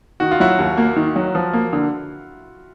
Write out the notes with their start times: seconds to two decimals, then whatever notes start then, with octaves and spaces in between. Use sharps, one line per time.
0.20 D#3 F#4
0.31 F4
0.40 F#3 E4 F#4
0.59 D#2
0.78 A#3
0.96 D#3
1.16 F#3
1.35 F3
1.53 A#3
1.73 D3